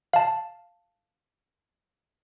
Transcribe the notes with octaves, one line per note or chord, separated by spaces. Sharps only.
F5 A5